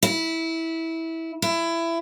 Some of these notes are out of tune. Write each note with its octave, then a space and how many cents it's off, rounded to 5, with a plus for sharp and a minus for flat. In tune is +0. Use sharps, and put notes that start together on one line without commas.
E4 -15
E4 +20